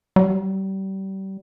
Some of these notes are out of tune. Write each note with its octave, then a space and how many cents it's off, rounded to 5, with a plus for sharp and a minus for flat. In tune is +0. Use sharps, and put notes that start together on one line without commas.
G3 -30